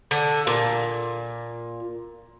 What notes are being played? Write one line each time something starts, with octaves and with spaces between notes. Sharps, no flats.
D3
A#2